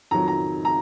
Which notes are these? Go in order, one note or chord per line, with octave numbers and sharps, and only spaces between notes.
F2 D#3 F#3 A#5
A#5
A#5